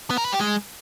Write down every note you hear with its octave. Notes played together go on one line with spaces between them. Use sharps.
B3
A#4
B4
G4
G#3